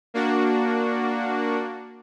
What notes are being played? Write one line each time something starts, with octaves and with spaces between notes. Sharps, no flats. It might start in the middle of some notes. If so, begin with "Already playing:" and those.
A#3 D4 F#4